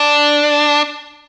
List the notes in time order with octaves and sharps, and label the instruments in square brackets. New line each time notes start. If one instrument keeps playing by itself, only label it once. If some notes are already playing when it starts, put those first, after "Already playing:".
Already playing: [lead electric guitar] D4